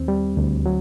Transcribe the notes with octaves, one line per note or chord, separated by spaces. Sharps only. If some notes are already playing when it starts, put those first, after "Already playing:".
Already playing: D#2 C4
G3
D2
F#3